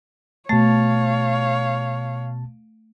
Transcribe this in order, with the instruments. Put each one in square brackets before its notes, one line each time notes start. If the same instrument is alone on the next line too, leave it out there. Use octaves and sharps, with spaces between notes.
[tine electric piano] B2 A5 A6 [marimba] A3 [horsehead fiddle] C#5 F5